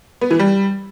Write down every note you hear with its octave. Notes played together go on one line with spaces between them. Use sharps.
B3
E3
G3